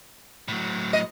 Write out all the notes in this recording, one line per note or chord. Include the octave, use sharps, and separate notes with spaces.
A2 F#3
D#5